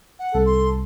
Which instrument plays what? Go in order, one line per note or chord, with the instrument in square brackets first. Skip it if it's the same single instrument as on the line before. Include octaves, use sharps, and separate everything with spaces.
[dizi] F#5
[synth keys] C2 [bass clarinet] A4
[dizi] C6